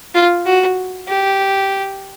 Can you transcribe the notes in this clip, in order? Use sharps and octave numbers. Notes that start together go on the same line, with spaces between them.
F4
F#4
G4